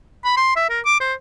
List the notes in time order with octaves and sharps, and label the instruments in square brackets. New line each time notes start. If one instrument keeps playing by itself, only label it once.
[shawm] B5
C6
E5
A#4
D6
C5